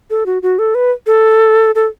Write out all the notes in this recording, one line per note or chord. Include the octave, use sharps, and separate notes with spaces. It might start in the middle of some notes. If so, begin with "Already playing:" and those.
A4
F#4
F#4
A4
B4
A4
A4